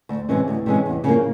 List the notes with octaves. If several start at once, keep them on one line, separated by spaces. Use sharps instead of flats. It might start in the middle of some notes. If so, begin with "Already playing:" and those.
D2
C3 E3 G#3 C#4
D2
C3 E3 G#3 C#4
E2
C#3 F3 A#3